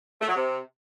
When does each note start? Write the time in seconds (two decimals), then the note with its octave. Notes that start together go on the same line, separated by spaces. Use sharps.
0.21 A3
0.28 F#3
0.35 C3